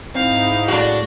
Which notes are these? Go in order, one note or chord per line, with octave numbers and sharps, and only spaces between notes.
G#2 C4 D#4 E4 F5
A2 D4 F#4 G#4